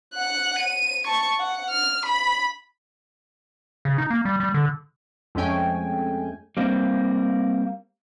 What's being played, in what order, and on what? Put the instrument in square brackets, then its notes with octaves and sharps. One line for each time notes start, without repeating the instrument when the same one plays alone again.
[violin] F#5 F#6
D#7
A5 C#6
F#5
F6
B5
[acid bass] C#3
D#4
A#3
G3
G3
D3
[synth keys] F2 G#3 A3 C#4 G5 G#5
[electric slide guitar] G3 A#3 C4